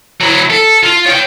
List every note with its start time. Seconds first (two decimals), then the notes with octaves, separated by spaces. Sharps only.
0.21 F#3 E4
0.50 A4
0.83 F4
1.06 C#5 G5